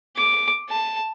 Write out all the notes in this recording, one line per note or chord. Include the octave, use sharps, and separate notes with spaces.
D6
A5